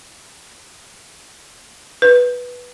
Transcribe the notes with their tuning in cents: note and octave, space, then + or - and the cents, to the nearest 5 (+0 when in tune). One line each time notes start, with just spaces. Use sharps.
B4 -5